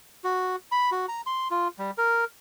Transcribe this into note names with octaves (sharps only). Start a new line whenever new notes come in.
F#4
B5
F#4
A#5
C6
F4
G3
A#4